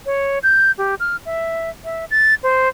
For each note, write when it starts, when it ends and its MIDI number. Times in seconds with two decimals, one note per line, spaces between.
0.06 0.39 73
0.43 0.72 91
0.78 0.95 67
1.00 1.16 89
1.25 1.70 76
1.85 2.05 76
2.11 2.34 93
2.43 2.69 72